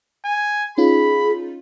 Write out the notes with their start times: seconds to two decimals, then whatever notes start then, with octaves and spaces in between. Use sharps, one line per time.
0.25 G#5
0.78 C#4 D#4 F4 G#4 B5